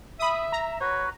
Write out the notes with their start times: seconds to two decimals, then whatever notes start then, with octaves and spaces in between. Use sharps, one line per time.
0.20 E5 B5 D#6
0.52 A#5
0.81 F#4 B4 C#5